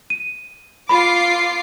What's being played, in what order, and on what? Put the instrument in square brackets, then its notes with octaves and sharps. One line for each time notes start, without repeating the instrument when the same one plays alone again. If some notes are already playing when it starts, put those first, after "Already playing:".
[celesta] D#7
[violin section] F4 D6 C7 [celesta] B5